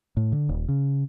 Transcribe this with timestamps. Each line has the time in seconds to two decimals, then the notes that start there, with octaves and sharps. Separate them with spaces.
0.17 A2
0.32 D3
0.49 D#1
0.68 C#3